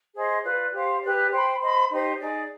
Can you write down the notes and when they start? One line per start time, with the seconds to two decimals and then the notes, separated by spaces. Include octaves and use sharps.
0.13 G#4 C5 D#5
0.43 F4 B4 D5
0.72 G4 C5 F5
1.01 G4 B4 D5
1.31 C5 G5 B5
1.60 C5 D#5 B5
1.89 D#4 G4 C5
2.18 D#4 G#4 D5